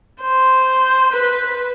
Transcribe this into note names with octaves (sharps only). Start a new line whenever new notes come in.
C5
B4